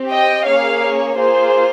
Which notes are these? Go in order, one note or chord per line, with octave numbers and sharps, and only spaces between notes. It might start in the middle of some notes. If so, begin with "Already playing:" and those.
Already playing: C4 G4
D#5 G5
A#3 C#4 G#4 C#5 F5
C#5
A#3 F4 G#4 C5